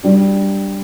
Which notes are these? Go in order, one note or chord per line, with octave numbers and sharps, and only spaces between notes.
G3 D4